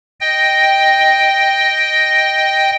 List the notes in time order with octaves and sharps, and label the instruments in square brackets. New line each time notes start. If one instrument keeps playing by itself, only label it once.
[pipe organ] D#5 G5